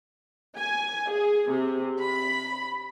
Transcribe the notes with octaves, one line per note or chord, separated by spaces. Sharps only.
G#5
G#4
C3
B5